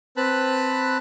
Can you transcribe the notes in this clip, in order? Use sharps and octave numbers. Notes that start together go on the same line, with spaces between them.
C4 B4 A5 B5 F#6